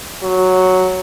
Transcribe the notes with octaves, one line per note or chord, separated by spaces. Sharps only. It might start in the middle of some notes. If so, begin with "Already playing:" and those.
F#3